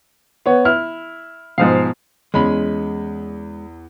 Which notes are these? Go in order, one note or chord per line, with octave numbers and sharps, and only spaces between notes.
B3 C#5
E4 F6
G#2 B2 F3 F5
E2 G#3 C#4 B5